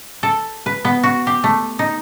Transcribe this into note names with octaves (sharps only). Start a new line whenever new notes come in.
A4
B4
B3
F#4
G4
A3
D#4